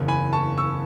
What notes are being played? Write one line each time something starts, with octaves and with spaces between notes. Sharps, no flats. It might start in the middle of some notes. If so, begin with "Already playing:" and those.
Already playing: F#1 E2 C#3
G#5 B5
A5 C#6
C#6 E6